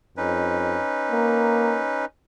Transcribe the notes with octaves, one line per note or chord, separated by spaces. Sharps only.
F2 C#4 D#4 B4
A#3